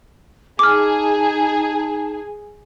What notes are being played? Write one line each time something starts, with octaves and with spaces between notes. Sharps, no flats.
D#4 G#4 A5 D6 F6